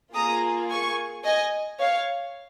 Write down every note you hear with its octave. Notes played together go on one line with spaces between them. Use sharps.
A#3 F4 G#4 A#5 D#6
G#5 C#6
D#5 G#5
C#5 F5